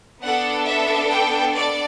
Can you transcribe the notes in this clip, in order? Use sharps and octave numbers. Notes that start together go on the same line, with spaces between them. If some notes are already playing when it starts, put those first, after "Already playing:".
B3 D4 A4 F#5
E5
G5
D5